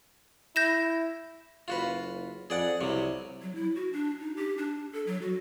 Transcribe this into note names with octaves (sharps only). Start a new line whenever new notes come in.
E4 G6 A#6 E7
F#1 F4 F#4 B4
F2 G#4 D5 F#5
C2 C3 F#3
F#3
E4
F#4
D4
D#4
G4
D4
A4
F#3
F#4